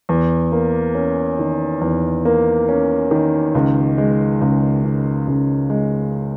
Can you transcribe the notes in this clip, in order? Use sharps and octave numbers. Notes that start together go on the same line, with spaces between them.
E2
A#3
C#4
D#3
E2
A#3
C#4
D#3
C#2
G#3
C#2
C#3
C#2
G#3